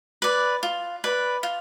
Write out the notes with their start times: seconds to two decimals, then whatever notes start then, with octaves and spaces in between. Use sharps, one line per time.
0.22 B4 D5
0.63 F4
1.04 B4 D5
1.43 F4